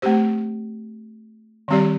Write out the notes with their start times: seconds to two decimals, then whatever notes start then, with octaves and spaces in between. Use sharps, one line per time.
0.02 A3 C4 G4 C5
1.68 D#3 G3 C4 G4 D5